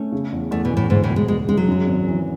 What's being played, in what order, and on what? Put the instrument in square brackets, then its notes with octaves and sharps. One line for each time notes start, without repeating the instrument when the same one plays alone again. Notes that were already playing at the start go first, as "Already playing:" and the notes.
Already playing: [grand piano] A3 [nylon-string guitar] C#4
[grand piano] C#3
E2
[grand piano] E2 [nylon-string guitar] A3
[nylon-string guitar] B2
[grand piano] E3
[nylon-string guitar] A2
[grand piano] D2 [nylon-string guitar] G#2
[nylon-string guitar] A2
[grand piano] E1
[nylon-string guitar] G#3
[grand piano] E1 [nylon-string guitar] G#3
[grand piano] C#3 [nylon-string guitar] G#3
[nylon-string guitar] F#3
[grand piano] F#2
G#1
E3